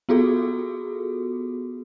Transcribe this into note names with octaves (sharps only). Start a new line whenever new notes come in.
B3 F4 F#4 G#4 A4